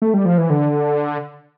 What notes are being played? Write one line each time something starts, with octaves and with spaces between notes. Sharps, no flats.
A3
G3
F3
E3
D3